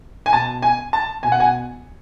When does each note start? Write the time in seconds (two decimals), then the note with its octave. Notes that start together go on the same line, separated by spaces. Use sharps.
0.26 G#5
0.33 B2 A5
0.62 G#5
0.93 A5
1.23 B2 G#5
1.32 F#5
1.40 G#5